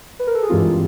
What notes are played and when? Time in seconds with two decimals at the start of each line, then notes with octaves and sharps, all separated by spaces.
0.20 B4
0.27 A#4
0.35 A4
0.42 G#4
0.50 G2 E3 G#3 C4 F4 G4